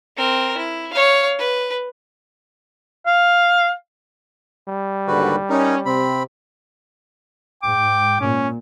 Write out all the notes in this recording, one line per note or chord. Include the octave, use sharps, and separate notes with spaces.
C4 A#4
E4
C#5 F5
B4
F5
G3
D#2 G#2 D3 F#4 B4
C#4 D#4 A#4
C3 C4 B5
G#2 G5 D6
A#2 C#4